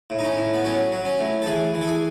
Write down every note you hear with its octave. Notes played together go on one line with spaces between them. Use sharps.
A2
D#4
C#4
A2
B3
F#3 C#4
F#3
C#4
A2
A4
E3 G#4
E3
A4
G#4